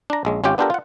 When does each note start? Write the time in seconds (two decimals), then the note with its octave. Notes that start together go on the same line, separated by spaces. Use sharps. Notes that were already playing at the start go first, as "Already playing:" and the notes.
0.10 D4 A#5
0.25 A#1 G#3 C#4
0.44 G#1 C#4 F4 G4 G5
0.58 B3 D4 F4 G4 A4 A#4
0.70 F4 F#5